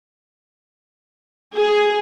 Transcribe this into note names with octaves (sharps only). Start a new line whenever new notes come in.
G#4